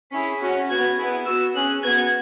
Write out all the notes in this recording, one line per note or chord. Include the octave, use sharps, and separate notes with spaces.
C#4 E4 G#4 B6
C#4 F#4
B3 F#4 G#6
B3 E4 G#4
B3 F#4 E6
C#4 G#4 F#6
B3 F#4 G#6